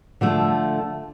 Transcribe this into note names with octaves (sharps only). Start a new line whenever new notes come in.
D3 F3 A3